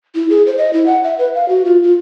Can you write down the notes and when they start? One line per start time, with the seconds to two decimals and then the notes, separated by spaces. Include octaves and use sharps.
0.15 E4
0.30 G#4
0.47 C5
0.58 D#5
0.73 E4
0.86 F#5
1.04 E5
1.19 B4
1.35 F5
1.49 F#4
1.65 F4
1.83 F4